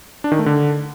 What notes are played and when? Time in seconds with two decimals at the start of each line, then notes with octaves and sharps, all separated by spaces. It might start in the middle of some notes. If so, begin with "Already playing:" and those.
0.24 D4
0.32 D#3
0.39 A3
0.46 D3